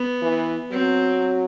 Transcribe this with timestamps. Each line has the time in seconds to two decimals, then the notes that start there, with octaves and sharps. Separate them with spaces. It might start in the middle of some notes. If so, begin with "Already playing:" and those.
Already playing: B3
0.22 E3
0.71 F#3 C4